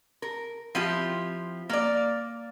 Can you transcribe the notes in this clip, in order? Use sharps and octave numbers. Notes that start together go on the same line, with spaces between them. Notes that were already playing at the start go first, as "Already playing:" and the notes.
A#4
F3 C4 E4 F4 G4
A#3 D5